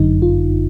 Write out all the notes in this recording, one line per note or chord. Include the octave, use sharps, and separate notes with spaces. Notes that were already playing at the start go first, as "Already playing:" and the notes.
Already playing: G1 F#2 D3 D#4
F4